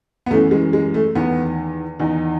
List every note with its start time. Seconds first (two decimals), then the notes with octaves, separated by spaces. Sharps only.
0.26 B3
0.31 F#2 E3 A3
0.51 G#3
0.73 G#3
0.94 A3
1.15 E2 D#3 B3
1.99 E2 D#3 D#4